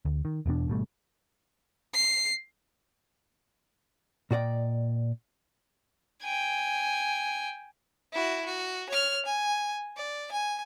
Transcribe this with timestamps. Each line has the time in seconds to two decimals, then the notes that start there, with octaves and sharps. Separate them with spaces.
0.05 D2
0.25 D#3
0.46 E1 E2 B2 D4
0.68 G#1 B2 G3 A3
1.94 C7
4.31 A#2 F#4 D5 D#5 G5
6.23 G5 G#5
8.12 E4 F#4
8.45 F#4
8.89 C#5 F6
9.25 G#5
9.96 D5
10.31 G#5